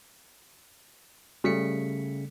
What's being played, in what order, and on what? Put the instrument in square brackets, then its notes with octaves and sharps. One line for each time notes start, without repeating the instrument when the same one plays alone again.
[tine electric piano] C#3 B6 C#7 [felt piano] G3 A3 A4